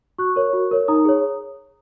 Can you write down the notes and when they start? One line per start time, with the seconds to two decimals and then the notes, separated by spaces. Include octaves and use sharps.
0.18 F#4 C#6 F#6
0.36 A#4 C#5
0.53 F#4
0.71 A#4 C#5
0.88 D#4 A#5 D#6
1.05 G#4 C#5